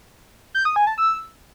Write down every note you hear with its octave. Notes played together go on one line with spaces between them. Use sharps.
G6
D#6
G#5
A5
E6